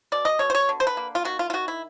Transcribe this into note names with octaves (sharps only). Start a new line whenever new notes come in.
B2 D5
D#5
B2 C#5
C5
C#5
D3
C5
B4
A#3
F4
D#3 F#4
F4
F4
D#3 F#4
E4